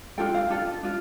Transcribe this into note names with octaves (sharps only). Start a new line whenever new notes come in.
D4 F4 A4 G5
F5
D4 F4 A4
D4 F4